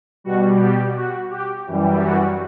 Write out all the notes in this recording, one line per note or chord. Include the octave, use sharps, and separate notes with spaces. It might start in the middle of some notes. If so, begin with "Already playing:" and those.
B2 G3 F#4
G4
F#4
G4
F#2 E3 G3
F#4